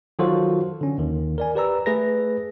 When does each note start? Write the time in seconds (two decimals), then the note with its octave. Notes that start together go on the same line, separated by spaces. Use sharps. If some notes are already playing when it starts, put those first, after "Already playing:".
0.19 D#3 F#3 F4 F#4 A4 C5
0.81 D3 C#4
0.98 D#2 D#3
1.38 A#4 D5 G#5
1.55 G4 B4 D5 A#5 E6
1.86 A3 G#4 B4 A#6